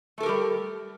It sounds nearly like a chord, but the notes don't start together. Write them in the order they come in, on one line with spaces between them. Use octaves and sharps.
A3 A4 A#4 G4 G3